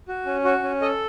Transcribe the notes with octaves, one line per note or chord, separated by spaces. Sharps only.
F#4
C#4
F#4 C#5
C#4
A4 D#5